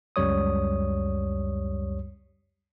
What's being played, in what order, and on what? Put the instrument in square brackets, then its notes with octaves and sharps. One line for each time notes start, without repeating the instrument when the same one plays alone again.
[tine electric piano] C#2 F#2 G3 C#5 D#6